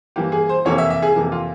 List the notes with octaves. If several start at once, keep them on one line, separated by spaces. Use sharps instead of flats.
G2 E3 A#3 G4
G#4
C5
F2 C3 E3 A#3 C#5
E5
E5
G#4
F2 C3 E3 A#3
F4